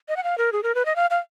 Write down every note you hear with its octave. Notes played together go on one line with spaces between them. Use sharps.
D#5
F#5
F5
A#4
G#4
A#4
B4
D#5
F5
F5